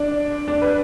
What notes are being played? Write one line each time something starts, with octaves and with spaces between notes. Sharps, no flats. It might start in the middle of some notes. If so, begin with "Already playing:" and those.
Already playing: D4
D4
B4